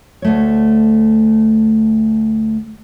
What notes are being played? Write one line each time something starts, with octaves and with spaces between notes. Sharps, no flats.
D2 A3 C#5